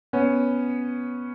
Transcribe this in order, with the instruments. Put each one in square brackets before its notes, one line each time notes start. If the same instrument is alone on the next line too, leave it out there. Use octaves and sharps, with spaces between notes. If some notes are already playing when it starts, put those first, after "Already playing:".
[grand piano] B3 C#4